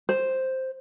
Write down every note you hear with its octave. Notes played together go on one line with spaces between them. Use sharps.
C5